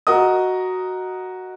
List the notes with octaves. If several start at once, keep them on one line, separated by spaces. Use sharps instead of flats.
F#4 A#4 D#5 D#6